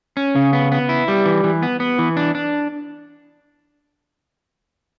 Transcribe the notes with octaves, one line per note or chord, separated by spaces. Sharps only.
C#4
C#3
B3
B3
E4
G3
E3
E3
B3
B3
E3
D4
D4